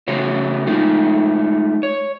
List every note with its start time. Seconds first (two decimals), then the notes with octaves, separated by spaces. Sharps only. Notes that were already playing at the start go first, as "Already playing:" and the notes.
0.08 C#3 A3 F#4 C5 C#5
0.67 G#3 A3 D#4 F4
1.83 C#5